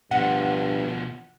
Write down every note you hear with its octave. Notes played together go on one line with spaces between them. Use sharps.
G2 B2 F3 F#5